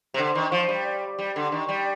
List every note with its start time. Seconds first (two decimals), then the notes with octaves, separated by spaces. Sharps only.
0.14 C3
0.18 D3
0.35 D#3
0.52 F3
0.69 G3
1.19 G3
1.36 D3
1.52 D#3
1.69 G3